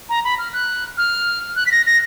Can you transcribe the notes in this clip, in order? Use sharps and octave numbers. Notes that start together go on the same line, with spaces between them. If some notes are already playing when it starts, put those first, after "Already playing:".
A#5
B5
F6
F#6
F6
F#6
B6
A#6
A#6